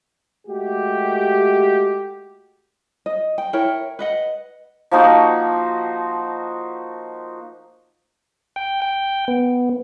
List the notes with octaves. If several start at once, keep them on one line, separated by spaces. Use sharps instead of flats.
G#3 A3 F#4 G4
D#5
G5
E4 A#4 C#5 G5
B4 D#5 F#5
F3 A#3 D#4 F#4
G5
G5
B3